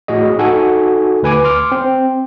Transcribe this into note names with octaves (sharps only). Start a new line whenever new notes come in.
A2 F#4 G#4 D#5
D#4 F#4 A4 F#5 G#5
D2 B4 G#5 D6
C6 D6 F6
C4